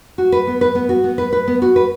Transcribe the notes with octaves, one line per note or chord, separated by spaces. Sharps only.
F#4
B4
B3
B4
B3
F#4
B3
B4
B4
B3
F#4
B4